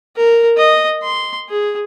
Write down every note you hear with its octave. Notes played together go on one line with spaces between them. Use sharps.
A#4
D#5
C6
G#4